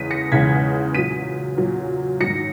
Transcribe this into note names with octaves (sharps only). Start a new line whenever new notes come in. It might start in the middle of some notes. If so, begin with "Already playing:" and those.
Already playing: E2 C#3 G#3 B6 D#7
A#6 C#7
E2 C#3 G#3 G#6 B6
A#2 F#3 B6 D#7
A#2 F#3
G#2 D#3 F#3 A#6 C#7